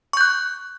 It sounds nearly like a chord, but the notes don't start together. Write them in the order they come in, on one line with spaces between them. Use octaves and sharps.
C#6 G6 F#6